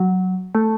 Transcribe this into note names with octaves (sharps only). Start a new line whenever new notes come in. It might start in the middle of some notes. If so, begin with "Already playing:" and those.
Already playing: F#3
A3